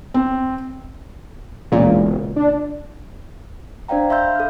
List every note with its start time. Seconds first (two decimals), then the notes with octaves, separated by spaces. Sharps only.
0.14 C4
1.72 E1 C#2 A#2
2.36 D4
3.88 D4 C5 D5 F5 G5 A#5
4.10 E5 F5 B5 C6 E6 G6
4.36 A4 F6